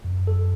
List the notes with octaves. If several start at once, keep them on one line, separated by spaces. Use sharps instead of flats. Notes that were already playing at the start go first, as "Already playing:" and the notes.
F#2
F#2 A4